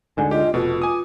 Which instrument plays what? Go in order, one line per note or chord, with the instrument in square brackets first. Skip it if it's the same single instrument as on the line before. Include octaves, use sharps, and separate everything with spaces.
[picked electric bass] D2 G#2 D3 [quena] G#5
[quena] F4 [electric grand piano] G4 [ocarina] D#5
[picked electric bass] F1 B3 [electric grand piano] B2 [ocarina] F4 [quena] A4
[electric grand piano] G#5 D#6 [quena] D6